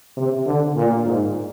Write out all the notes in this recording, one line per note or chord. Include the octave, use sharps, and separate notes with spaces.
C3
D3
A#2
G#2